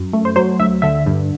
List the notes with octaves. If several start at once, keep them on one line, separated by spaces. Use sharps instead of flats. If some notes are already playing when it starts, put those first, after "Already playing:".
Already playing: F#2
A3
C5
F#3 C5
D2 E5
D3 E5
G2